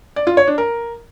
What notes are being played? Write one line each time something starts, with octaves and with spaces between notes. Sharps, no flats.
D5
F4
C#5
D4
A#4